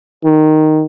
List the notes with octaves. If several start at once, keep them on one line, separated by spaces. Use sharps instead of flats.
D#3